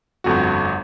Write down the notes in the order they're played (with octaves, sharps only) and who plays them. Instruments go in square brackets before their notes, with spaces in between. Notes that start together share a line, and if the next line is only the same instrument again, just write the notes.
[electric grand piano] G1 F2 A3 F#4